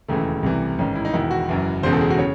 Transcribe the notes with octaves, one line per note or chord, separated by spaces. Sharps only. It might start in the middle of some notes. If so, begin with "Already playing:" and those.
E1 D#2 C#3 E3 A3
C2 C3 E3
A1 G#2 D#3 C#4
E4
D#4
E1 E2 D#3 E4
F#4
F#1 F#2 E3
E1 E2 C#3 C5
A4
G#4
F#4
C#3 C#5